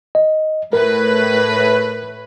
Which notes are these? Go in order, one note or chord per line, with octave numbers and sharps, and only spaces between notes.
D#5
A2 A#4 B4